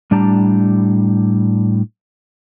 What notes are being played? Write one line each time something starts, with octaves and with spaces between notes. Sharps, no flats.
A2 G3 D4 G4 A5 A#5